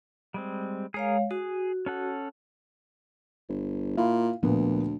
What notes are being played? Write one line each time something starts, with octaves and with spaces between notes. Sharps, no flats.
G3 G#3 C4
G#3 G#4 A#4 C#5 F5
F#4 G#4
C#4 A4 F#5
G1
A#2 E4 F5
D2 A#2 F3 B3